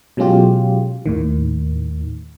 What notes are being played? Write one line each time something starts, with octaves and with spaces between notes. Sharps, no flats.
B2 F#3 G#3 C#4 F4 G4
D#2 A2 D#3